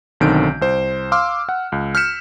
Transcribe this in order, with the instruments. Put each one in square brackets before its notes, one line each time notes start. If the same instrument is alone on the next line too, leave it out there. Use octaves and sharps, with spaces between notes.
[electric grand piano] B1 D3 D#3 C4 G6 D7
C2 C5
F5 C6 D6 E6 F6
F#5
C#2
F6 G6 B6 C#7 E7